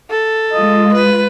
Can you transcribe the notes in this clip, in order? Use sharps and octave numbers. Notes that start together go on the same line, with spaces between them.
A4
G#3 F4 D#5
B4